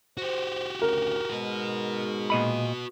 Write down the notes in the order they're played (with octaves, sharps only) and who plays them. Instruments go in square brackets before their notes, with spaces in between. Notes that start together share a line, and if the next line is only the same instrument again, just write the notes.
[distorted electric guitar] F#4 G4 [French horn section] C5
[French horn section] D2 C#3 [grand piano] A#4
[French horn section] G#2 G#3 [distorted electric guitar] F#4 B4
[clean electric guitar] A#2 D#5 B5